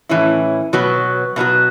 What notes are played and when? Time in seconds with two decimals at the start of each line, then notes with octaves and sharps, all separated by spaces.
0.09 A2 E3 C#4 E4
0.73 B2 F#3 B3 F#4
1.36 B2 F#3 B3 F#4